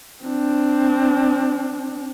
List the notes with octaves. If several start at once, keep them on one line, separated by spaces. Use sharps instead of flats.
C4 D4